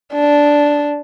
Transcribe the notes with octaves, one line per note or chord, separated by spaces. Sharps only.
D4